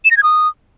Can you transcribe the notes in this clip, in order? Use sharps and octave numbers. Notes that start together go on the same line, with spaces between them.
E7
A#6
G#6
D#6